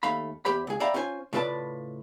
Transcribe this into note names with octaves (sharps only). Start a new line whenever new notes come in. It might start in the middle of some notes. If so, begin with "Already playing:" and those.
D#2 A3 F5 B5
E2 G4 C5 B5
C#2 G#4
D5 E5 F5 G5 A#5 B5
C#4 F4 C5 G#5
A2 C#3 F4 B4 D5 A5